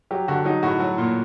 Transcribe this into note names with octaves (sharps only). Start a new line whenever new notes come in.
F#3 G4
D3 F#4
F#3 D#4
A2 F#4
F#3
A#2